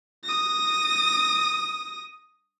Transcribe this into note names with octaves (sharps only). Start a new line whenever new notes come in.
D#6 A#6